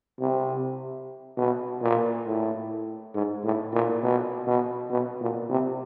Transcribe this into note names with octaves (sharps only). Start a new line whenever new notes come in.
C3
B2
A#2
A2
G#2
A2
A#2
B2
B2
B2
A#2
C3